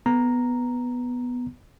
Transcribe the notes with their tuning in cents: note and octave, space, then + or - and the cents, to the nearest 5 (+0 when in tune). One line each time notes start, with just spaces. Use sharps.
B3 +0 A#5 +0